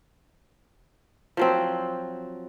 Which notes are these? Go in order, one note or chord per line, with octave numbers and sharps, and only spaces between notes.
F3 F#3 C4